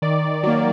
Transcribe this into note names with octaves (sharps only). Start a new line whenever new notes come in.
D#3 D5
F#3 A#3